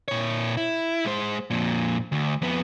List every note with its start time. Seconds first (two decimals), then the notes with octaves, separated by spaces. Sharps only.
0.08 A#2 C#5
0.57 E4
1.06 G#3 C5
1.50 F2 A#2
2.12 D2
2.42 F2 B3